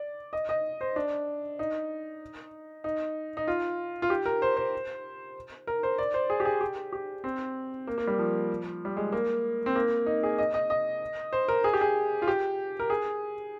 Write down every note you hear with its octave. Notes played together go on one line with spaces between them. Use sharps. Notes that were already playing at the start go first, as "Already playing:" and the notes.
Already playing: D5
D#5
D#5
C5
D4
D#4
D#4
D#4
F4
F4
G4
A#4
C5
C5
A#4
C5
D5
C5
G#4
G4
G#4
G4
G4
C4
A#3
A#3
G3
F3
G3
G#3
A#3
C4
A#3
D#4
G#4
D#5
D#5
D#5
C5
A#4
G#4
G4
G#4
F4
G4
A#4
G#4